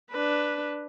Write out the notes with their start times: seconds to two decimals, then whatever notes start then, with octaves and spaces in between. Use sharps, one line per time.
0.11 D4 B4